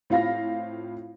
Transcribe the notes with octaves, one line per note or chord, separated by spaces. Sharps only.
A2 C4 F4 F5 B5 A#6